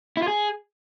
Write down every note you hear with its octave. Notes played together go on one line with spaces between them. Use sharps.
E4
F4
G#4